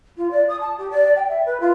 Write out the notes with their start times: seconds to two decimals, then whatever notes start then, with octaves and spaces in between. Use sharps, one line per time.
0.17 F4
0.31 D5
0.48 D#6
0.61 A5
0.78 G4
0.91 D5
1.16 G5
1.28 E5
1.46 B4
1.60 F4